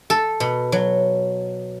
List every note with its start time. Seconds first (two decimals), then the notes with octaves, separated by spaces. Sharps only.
0.10 A4
0.40 B2
0.72 F#3